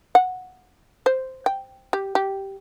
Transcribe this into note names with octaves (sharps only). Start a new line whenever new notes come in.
F#5
C5
G5
G4
G4